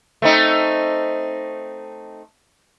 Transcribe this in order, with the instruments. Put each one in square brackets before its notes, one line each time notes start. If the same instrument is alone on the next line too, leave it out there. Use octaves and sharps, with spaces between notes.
[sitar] A3 C4 D#4